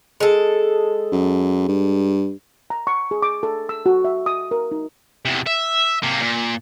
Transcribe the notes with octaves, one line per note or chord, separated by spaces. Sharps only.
G#3 A4
F#2
G2
A#5
C#6
G#4
D6
A4
E6
F#4
E5
D#6
A#4
D#4
E2 C3
E5
C3 A#3
A#2